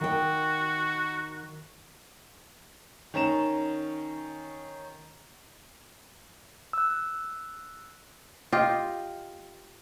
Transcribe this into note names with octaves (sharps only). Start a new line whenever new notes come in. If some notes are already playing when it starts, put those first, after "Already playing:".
D#3 F#4 G5
D#3 C#4 A#5 E7
E6 F#6
F4 G4 D#5